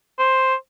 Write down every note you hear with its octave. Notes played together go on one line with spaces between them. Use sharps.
C5